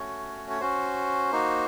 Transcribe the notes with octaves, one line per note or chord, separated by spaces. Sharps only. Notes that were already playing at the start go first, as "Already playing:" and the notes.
Already playing: A3 C#4 F#4 C#5
C#5
C#4 F#4 C5
A#3 D#4 F#4